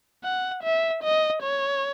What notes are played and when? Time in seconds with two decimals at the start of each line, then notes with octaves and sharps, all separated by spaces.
0.24 F#5
0.64 E5
1.03 D#5
1.42 C#5